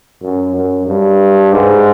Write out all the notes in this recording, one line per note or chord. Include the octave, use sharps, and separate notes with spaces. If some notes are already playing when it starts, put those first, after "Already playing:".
F#2
F#2
G2
G#2